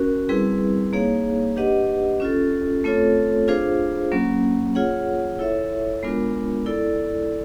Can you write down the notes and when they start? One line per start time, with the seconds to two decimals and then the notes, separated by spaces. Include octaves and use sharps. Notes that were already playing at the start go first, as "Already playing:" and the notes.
Already playing: C#4 F#4 A#4
0.29 G3 C4 E4 G#4 B4
0.93 A#3 D#4 G#4 C#5 F5
1.56 D4 G4 B4 D#5 F#5
2.20 C#4 F4 A4
2.84 A3 C4 F4 A4 C#5
3.48 D4 F4 G#4 C5 F5
4.12 F#3 A#3 C#4
4.75 F4 G#4 C#5 F#5
5.39 E4 A4 C#5 E5
6.03 G#3 B3 D4 F4 A#4
6.66 E4 A4 D5